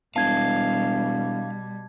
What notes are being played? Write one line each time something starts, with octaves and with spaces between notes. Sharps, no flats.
E1 B2 G3 F5 A5 G#6